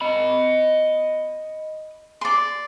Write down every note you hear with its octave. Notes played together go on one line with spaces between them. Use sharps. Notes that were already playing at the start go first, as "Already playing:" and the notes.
D#5 B5
D5 C6